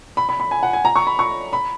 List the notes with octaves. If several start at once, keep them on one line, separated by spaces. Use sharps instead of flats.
B5
B5
B5
G#5
F#5
G#5
A#5
C#6
B5
C#6
B5